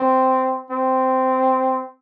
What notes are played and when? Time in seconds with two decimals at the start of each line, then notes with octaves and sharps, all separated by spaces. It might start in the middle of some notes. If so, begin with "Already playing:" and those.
Already playing: C4
0.70 C4